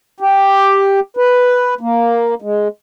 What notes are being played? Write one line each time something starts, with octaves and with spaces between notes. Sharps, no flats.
G4
B4
A#3
G#3